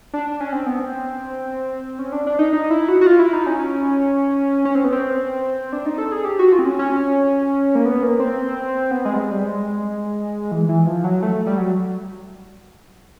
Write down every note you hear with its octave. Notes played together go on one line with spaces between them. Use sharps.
D4
C#4
C4
B3
C4
C#4
D4
D4
D#4
D#4
E4
F#4
F#4
F4
E4
D#4
C#4
C#4
C4
B3
C4
D4
D#4
A4
G#4
G4
F#4
F4
C4
C#4
C#4
A#3
B3
A#3
C4
B3
G#3
G3
G#3
G3
G#3
E3
E3
F3
F#3
A3
G3
F#3